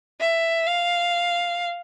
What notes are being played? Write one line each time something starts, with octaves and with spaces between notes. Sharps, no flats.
E5
F5